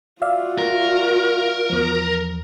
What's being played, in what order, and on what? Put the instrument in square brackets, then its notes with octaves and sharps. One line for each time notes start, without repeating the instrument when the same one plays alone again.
[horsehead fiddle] F4 F#4 [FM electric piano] D5 E5 F5
[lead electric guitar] A#4
[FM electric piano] E2 F3